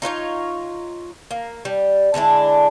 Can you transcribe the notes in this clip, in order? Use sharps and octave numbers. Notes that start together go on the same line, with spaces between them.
D#4 F4 C5 C#5
A#3
G3
D3 G#3 D4 E4